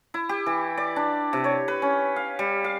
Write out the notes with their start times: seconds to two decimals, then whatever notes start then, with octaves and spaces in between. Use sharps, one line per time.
0.14 E4
0.29 G4
0.46 E3
0.77 D5
0.96 D4
1.33 C3
1.44 C#5
1.68 B4
1.82 C#4
2.16 F5
2.39 G3
2.64 F5